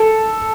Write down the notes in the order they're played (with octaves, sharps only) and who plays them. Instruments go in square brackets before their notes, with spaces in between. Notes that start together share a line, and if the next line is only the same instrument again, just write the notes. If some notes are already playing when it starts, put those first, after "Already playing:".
Already playing: [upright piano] A4